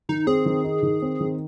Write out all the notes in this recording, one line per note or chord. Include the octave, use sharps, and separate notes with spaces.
D#3 D#4
C4 G#4
D#3
D#4
D#3
C4
D#3